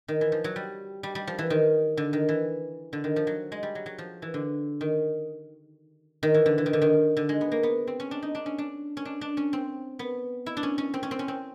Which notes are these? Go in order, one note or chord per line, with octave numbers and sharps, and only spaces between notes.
D#3
E3
F3
F#3
G3
G3
G3
F3
E3
D#3
D3
D#3
E3
D3
D#3
F3
F#3
G#3
G3
F#3
F#3
F3
E3
D3
D#3
D#3
E3
D3
E3
D#3
D3
D#3
D3
G#3
B3
A#3
B3
C4
C#4
D4
D#4
D4
C#4
D4
C#4
D4
D4
C#4
C4
B3
E4
D4
C#4
C#4
C4
C#4
C4
C#4
C4